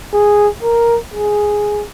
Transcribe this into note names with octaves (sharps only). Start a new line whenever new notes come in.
G#4
A#4
G#4